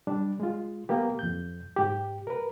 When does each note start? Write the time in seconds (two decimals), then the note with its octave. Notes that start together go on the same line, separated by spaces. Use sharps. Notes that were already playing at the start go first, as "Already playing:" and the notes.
0.07 G3 D4
0.40 G#3 F4
0.89 A#3 B3 G4
1.19 F2 G6
1.77 G#2 G4
2.27 A#4 B4